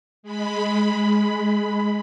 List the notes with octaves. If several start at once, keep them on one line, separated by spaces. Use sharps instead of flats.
G#3 B5